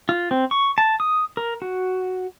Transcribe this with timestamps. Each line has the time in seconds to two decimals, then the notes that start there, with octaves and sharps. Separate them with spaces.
0.09 F4
0.31 C4
0.51 C#6
0.78 A5
1.00 D#6
1.37 A#4
1.62 F#4